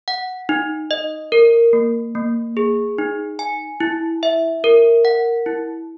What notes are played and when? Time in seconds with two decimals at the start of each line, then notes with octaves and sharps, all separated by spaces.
0.08 F#5
0.49 D#4
0.91 D#5
1.32 A#4
1.73 A#3
2.15 A#3
2.57 G#4
2.98 D#4
3.39 G#5
3.80 E4
4.23 E5
4.64 A#4
5.05 F#5
5.46 E4